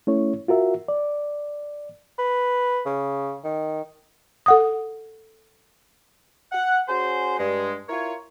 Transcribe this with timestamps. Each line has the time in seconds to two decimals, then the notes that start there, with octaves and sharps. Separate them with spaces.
0.07 A3 C#4 E4 C#5
0.48 F4 F#4 A#4 E5
0.88 D5
2.19 B4
2.86 C#3
3.44 D#3
4.46 A4 F#5 D#6
6.52 F#5
6.88 C#4 F#4 G#4 C5
7.39 G2 G#3
7.89 E4 F4 A#4 C#5